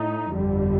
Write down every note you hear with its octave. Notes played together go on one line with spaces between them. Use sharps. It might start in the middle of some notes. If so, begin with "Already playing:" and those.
Already playing: A2 A3 D#4
G1 F2 D3 G3